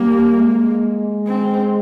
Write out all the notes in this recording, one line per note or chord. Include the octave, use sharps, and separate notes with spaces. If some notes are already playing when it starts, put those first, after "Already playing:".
Already playing: G3 A#3
G#3
C4